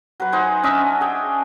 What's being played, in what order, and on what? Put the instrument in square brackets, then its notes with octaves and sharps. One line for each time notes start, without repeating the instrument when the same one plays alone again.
[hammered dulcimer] F#3 B4
D#4 C5 F#5 G#5
C#4 D4 D#5 E5
G#4 G5